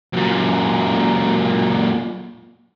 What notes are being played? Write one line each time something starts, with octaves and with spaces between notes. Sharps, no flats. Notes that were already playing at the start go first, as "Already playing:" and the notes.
F#2 A#2